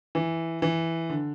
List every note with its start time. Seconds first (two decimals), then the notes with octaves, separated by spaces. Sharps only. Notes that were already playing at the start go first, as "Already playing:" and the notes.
0.15 E3
0.62 E3
1.10 D3